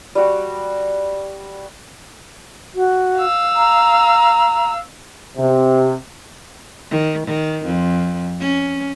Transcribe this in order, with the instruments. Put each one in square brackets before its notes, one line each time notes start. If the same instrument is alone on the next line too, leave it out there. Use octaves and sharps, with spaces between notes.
[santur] G3 F#4
[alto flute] F#4
[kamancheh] F5 E6
[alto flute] A#5
[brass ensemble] C3
[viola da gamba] D#3
D#3
F2
C#4